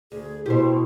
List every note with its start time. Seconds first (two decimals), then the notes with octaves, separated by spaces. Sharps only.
0.12 D2 G#4
0.46 B2 E4 G4 C5